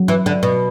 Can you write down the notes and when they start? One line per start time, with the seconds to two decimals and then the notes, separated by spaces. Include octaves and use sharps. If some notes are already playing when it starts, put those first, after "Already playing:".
Already playing: F#3
0.08 E3
0.26 D3
0.43 B2